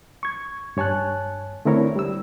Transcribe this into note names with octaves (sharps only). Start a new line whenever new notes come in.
C#6 G#6
G2 C#5 G#5 A5 F#6
D3 A3 C4 E4 A#4 C#5
G3 E6